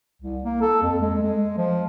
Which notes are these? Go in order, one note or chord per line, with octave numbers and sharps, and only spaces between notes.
C2
A#3
A4
F2
G#3
G#3
F3